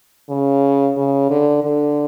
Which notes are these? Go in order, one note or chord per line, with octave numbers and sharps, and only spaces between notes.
C#3
C#3
D3
D3